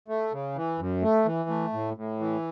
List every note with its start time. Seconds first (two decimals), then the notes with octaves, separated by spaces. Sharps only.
0.08 A3
0.32 C#3
0.56 E3
0.79 F#2
1.02 A3
1.26 E3
1.49 A3
1.73 A2
1.97 A2
2.20 E3